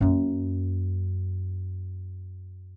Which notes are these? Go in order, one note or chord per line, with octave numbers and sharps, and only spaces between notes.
F#2 A#3